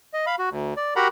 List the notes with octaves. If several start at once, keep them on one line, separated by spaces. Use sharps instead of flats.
D#5
F5 B5
F#4
D2
D5
F#4 G4 A#4 F#5 A#5 B5